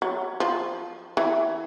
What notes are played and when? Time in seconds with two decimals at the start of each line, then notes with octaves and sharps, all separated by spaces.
0.02 F#3
0.40 F3
1.17 E3